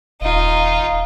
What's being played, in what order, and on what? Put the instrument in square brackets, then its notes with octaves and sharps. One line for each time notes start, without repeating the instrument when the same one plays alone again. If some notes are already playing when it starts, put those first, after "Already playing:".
[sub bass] D#1 [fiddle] D#4 F4